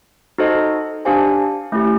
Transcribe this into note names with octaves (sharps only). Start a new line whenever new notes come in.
D#4 F#4 A4 C5 D#5
D4 G4 C5 F5 G#5
A3 C#4 E4 G4